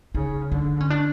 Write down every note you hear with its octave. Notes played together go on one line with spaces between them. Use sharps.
C#3 D#4
D3 D4
C#4
D4